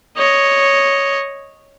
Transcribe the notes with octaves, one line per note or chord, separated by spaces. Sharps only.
C#5 D#5